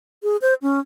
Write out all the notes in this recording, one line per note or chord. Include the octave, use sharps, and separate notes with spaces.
G#4
C5
C#4